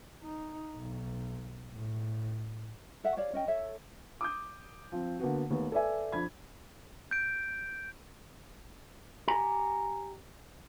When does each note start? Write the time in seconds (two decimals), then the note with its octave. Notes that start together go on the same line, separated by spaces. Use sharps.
0.23 D#4
0.77 B1
1.73 A2
3.04 A4 E5 F#5
3.17 G4 C#5 D5 F5
3.33 C#4 D#5 G5
3.48 A4 C#5 E5
4.21 D6 D#6 G6
4.92 F3 C4
5.20 D3 A#3 B3 F#4
5.50 D#2 A3 B3
5.72 A4 B4 D5 E5 G#5
6.12 F2 D4 B5 G#6
7.11 G6 D7
9.28 G4 G#5 A#5